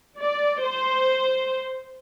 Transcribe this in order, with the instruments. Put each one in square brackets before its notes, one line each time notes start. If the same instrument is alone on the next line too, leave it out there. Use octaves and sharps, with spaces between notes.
[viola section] D5
C5